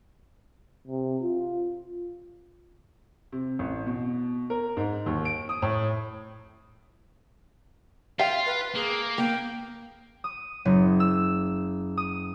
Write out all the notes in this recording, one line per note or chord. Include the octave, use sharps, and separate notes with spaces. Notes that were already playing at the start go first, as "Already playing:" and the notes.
C3
F4
C3
A1
B2
A#4
G#2
D#2
D7
D#6
A2
F4 E5 F5 G5
B4
A#3 G#4
A#3 G5
D#6
F#1
E6
D#6